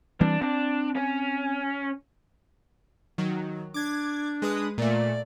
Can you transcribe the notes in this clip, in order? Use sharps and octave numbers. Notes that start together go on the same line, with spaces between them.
E3 G3 C4 D4
C4 D4
C#4
D#3 F#3
D4 D6 G#6
G#3 B4 D#6
A#2 A3 D5